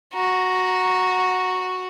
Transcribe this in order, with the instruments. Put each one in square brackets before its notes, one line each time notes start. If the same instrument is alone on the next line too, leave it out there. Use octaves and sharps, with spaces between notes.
[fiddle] F#4 [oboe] A#5